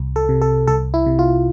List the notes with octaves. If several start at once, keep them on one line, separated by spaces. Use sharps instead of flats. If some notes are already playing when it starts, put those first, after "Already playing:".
Already playing: C2
A4
C3
A4
C2 A4
E4
C3
F4